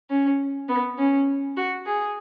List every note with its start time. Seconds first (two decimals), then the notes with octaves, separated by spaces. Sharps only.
0.10 C#4
0.69 B3
0.98 C#4
1.57 F#4
1.86 G#4